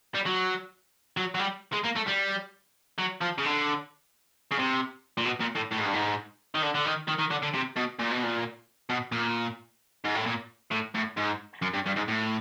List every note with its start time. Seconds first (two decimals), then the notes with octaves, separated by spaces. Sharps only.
0.15 G3
0.26 F#3
1.17 F#3
1.35 F#3
1.39 G3
1.73 G#3
1.85 A#3
1.96 A3
2.08 G3
2.98 F#3
3.21 F3
3.38 C#3
3.45 D3
4.51 C#3
4.59 C3
5.18 A#2
5.26 B2
5.41 A#2
5.56 A2
5.72 A2
5.78 G#2
5.86 G2
5.94 G#2
6.55 D#3
6.62 D3
6.75 D3
6.85 D#3
7.08 D#3
7.19 D#3
7.30 D3
7.42 D3
7.54 C3
7.76 B2
7.99 A#2
8.11 B2
8.23 A#2
8.89 B2
9.12 A#2
10.04 G#2
10.15 A2
10.26 A#2
10.71 A2
10.95 A2
11.17 G#2
11.62 F#2
11.74 G2
11.86 G2
11.96 G#2
12.08 A2